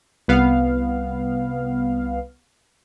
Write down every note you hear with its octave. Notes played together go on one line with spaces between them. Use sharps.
C2 B3 F5